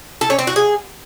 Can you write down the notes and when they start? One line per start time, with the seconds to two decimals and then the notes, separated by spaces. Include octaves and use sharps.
0.21 A4
0.30 C#4
0.39 C4
0.47 F#4
0.56 G#4